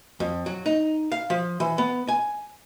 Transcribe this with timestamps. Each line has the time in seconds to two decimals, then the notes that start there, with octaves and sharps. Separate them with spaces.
0.20 F2
0.46 F#3
0.66 D#4
1.12 F5
1.30 F3
1.60 E3
1.78 B3
2.08 G#5